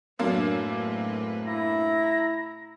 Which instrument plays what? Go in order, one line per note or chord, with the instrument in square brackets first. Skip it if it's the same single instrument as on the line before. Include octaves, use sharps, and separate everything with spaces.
[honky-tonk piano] F#2 A#3 D4 [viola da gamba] A2 C4 B4
[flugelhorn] E4 [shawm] A#5